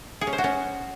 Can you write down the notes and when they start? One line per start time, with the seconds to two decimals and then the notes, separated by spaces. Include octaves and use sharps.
0.21 G#4
0.27 C#4
0.33 C5
0.38 F#4
0.44 C#4